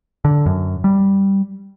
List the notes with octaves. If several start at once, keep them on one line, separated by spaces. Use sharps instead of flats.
D3
F#2
G3